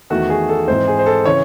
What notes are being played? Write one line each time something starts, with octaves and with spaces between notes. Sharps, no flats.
E2 D#3 A3 F#4
G#4
A4
G#2 E3 G#3 C4 C5
G#4
C5
A4
C#3 E3 C#5